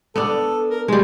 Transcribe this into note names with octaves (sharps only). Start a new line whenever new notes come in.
B3 D4 A4
A#4
G3 G#3 D#4